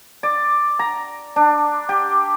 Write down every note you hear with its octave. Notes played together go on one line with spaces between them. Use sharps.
D5
A#5
D4
G4